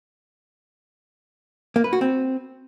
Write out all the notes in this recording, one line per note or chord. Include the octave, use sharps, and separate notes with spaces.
A#3
B4
F#4
C4